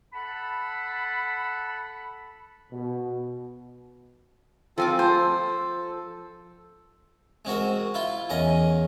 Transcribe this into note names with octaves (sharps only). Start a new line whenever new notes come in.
A4 F#5 A5 B5
B2
F3 C4 F4 A4 G#5 D6
A4 C5
G#3 C4 F#4 A#4
E4 F4 C6
E2 C#4 A#4 D#5